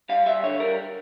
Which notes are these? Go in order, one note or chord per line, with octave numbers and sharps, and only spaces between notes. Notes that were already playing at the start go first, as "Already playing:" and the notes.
G3 F5
G3 E5
D3 C#5
G3 A#4